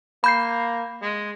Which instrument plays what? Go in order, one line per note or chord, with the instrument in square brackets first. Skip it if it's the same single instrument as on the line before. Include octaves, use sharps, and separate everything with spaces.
[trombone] A#3 [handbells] B5 G6 C7
[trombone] G#3